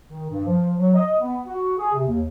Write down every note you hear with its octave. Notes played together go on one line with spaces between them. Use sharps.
D#3
G2
F3
F#3
D#5
B3
F#4
G#4
C3
D#2